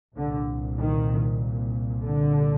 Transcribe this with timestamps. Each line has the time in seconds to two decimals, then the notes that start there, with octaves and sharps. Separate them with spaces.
0.16 C2 A#2 D3
0.79 D#3
2.04 D3